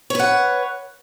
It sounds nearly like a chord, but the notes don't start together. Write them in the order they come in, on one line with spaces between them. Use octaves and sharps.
C#5 B4 F#5